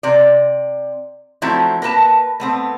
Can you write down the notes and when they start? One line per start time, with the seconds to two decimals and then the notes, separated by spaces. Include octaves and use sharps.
0.03 C3 D5
1.42 F3 F#3 A3 C4 E4
1.82 A#3 A#4 B4 A5
2.40 A3 B3 C4